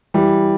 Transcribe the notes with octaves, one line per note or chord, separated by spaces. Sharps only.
E3 G3